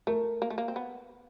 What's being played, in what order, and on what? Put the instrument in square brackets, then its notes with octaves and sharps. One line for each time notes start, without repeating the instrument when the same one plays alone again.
[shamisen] A3 [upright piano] A#4
[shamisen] A#3
A3
A#3
C4
B3